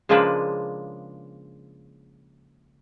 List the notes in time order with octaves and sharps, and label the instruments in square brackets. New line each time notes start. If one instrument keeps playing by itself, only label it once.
[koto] C#3 F3 G#3 A#3 D4 B4